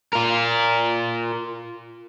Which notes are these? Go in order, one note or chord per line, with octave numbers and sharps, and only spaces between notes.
F4 A#4